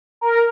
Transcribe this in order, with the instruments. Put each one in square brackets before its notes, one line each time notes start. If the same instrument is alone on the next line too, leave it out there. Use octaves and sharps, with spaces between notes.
[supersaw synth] A#4